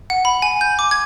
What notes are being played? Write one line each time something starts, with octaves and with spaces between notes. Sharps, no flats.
F#5
B5
G#5
G6
D6
G#6